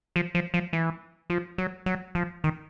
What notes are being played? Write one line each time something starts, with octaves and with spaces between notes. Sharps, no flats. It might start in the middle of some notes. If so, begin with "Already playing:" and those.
F3
F3
F3
E3
F3
F#3
F#3
F3
D#3